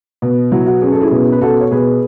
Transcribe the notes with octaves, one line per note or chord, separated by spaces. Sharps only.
B2
F#3 E4
F#4
C#4 G#4
A4
E4 G#4
B2
B4
B2 F#4 A4
C#5
B2 G#4 B4